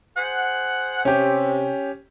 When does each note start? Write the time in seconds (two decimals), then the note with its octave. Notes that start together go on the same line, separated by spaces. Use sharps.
0.16 G#4 C5 F#5
1.05 C3 C#4 G4